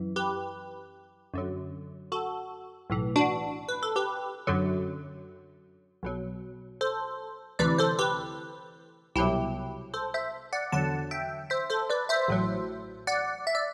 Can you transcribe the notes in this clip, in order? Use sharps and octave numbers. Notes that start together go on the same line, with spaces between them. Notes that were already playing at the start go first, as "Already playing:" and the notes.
Already playing: F#2 E3
G4 B4
F#2 D3 F#3
F#4 A4
B1 A2 E3
D4 F#4
B4
A4
G4 B4
F#2 D3 F#3
B1 B2 F#3
A4 C5
D2 C3 E3 B4 D5
A4 C5
G4 B4
C2 B2 F#3 E4 G4
A4 C5
C5 E5
D5 F#5
E2 D3 F#3 F#5 A5
E5 G5
C5 E5
A4 C5
B4 D5
C5 E5
A1 A2 F#3
D5 F#5
E5
D5